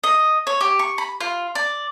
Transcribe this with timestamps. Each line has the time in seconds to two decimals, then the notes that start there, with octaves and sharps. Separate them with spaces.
0.04 D#5
0.47 C#5
0.61 G4
0.79 C#6
0.98 B5
1.21 F4
1.55 D5